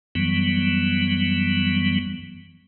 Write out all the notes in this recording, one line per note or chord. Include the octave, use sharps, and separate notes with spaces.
F#2 E3 F#3 G3 B3